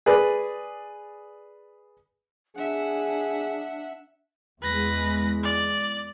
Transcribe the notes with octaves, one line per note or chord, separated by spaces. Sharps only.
G#4 B4 D5
D4 G#4 E5 F#5
E2 G#3 B4 A#6
D5